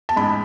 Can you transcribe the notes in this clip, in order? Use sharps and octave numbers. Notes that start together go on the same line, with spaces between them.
A5
A1 G#2 G#3 B5